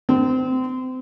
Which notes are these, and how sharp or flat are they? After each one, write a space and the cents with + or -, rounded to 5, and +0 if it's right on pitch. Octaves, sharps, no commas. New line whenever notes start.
C4 -30